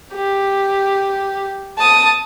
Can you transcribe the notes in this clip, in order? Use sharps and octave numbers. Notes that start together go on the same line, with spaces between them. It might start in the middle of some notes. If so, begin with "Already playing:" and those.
G4
A5 D#6